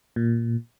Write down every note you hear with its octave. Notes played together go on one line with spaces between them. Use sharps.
A#2